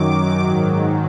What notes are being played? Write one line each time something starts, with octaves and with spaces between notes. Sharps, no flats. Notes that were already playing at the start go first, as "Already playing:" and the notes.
Already playing: F#2 D#3 F#3 D6
G#2 D#3 F#3